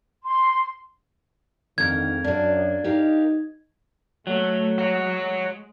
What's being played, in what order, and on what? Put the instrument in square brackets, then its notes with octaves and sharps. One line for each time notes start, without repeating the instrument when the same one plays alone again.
[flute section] C6
[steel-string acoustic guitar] F2 A#4 [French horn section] G#2 D3 D#3 [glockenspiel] G#6
[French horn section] F#2 [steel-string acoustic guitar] A#3 D4
[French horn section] D#4 [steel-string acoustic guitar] G4 A#4 F5
[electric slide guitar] F#3 [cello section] A3
[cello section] G#3 [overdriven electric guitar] F#4 C#5